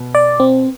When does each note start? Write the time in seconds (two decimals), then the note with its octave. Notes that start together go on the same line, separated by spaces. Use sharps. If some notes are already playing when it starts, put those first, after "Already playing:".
Already playing: B2
0.15 D5
0.40 C4